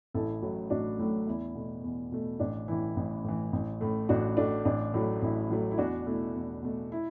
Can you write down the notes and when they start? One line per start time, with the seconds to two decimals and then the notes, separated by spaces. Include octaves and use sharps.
0.14 A1 E4 A4
0.42 A2 F#3 A3
0.70 A1 D4 F#4
0.99 A2 F#3 A3
1.27 E2 E4
1.55 B2 A3
1.84 E2
2.12 B2 A3
2.40 A1 D4
2.68 A2 E3 E4
2.96 A1
3.24 A2 E3
3.53 A1
3.81 A2 A3
4.09 A1 D4 F#4
4.37 A2 A3 D4 F#4
4.65 A1 D4
4.94 A2 F#3 A3
5.22 A1 E4
5.50 A2 F#3 A3
5.71 E4
5.78 E2 D4 F#4
6.06 B2 A3 E4
6.35 E2
6.63 B2 A3
6.92 E4